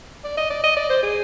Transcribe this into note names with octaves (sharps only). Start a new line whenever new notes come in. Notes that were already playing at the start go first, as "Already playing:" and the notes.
D5
D#5
D5
D#5
D5
C5
G#4